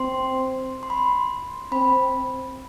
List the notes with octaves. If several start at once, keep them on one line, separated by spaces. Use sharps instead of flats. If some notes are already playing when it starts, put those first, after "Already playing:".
Already playing: C4 C6
C6
B5
C6
C4 B5